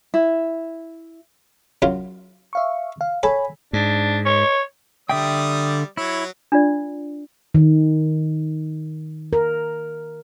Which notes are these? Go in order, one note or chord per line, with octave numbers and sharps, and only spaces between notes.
E4
F#2 F#3 F4
E5 F5 C#6
F5
A4 C#5 G#5 B5
G#2 D4
C#5
D3 G3 D5 E5 G5 D#6
F#3 E4 C#5
D4 F4 D5
D#3
A#4